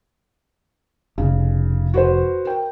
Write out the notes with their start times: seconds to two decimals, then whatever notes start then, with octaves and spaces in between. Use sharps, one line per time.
1.18 F1 C#3
1.94 F#4 B4 C5
2.45 A#4 G5